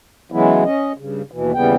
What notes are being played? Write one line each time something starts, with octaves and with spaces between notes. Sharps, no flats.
C#3 E3 F#3 G#3 B3 E4
C#4 D#5
G2 C#3
D#2 B2 E3
D#2 C#3 E3 G3 B3 G5